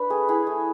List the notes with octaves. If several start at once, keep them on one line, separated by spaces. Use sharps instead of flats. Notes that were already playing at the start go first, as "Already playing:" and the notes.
Already playing: D4 B4
A3 G#4
E4 G#4
A3